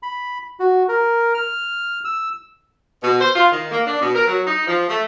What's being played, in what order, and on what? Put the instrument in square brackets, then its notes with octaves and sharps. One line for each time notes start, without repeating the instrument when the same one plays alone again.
[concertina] B5
F#4
A#4
F6
E6
[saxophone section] B2
C5
F4
D#3
A#3
D4
B2
A#4
F#3
D#4
F3
A3